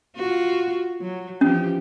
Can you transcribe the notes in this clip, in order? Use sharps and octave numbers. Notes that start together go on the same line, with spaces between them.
F4 F#4
F#3
E3 F3 C#4 G4